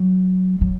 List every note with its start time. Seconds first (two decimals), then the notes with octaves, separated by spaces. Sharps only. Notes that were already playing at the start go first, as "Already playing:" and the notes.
Already playing: F#3
0.61 F#3